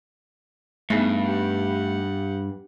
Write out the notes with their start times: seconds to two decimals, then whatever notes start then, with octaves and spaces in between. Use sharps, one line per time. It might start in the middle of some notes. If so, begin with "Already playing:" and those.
0.90 G2 A3 B3 D#4 G#4
1.22 G4 F#5